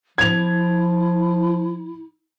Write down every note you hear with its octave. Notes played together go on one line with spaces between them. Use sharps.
F3 E4 G#6 F7